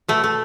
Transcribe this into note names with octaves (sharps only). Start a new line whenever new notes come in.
B2 A3
A3